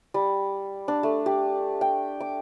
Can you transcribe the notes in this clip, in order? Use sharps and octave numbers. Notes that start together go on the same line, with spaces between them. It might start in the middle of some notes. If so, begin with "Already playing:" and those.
G3
D4
A3
G4
G5
D6